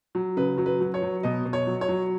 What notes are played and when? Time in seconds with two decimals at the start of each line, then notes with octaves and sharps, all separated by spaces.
0.15 F#3
0.37 C#3 B4
0.58 F#3
0.66 B4
0.81 F#3
0.94 C#5
1.02 F#3
1.23 B2 D#5
1.45 B2
1.53 C#5
1.67 F#3
1.81 C#5
1.88 F#3